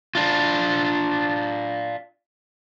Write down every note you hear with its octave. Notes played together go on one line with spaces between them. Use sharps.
D4 F4